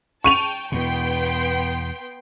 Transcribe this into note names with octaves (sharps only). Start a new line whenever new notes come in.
G5 A5 C#6 D#7 F7
E2 B2 B3 G5 C6